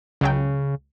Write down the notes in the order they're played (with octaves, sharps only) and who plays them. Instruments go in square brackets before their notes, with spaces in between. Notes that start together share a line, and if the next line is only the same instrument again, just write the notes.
[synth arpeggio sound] C#2 F#3 G5 [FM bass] C#3